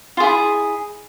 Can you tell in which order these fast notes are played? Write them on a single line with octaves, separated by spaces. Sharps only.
F4 G#4 E4